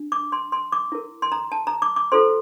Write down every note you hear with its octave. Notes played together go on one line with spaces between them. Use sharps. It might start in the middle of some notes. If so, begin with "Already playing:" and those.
Already playing: D4
D6
C6
C6
D6
E4 A#4
C6
A#5
A5
A#5
D6
D6
F4 A4 C5 C6